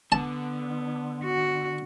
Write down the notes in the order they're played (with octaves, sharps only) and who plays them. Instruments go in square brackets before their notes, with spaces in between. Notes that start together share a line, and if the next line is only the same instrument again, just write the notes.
[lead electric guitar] D3 [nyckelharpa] B3 [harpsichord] A5
[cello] F#4